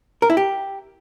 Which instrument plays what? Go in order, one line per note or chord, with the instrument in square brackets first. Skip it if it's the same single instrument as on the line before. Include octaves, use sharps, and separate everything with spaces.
[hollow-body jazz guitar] A#4
E4
G4